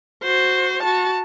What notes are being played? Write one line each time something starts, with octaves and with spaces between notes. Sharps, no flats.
F#4 C5
F#4 A5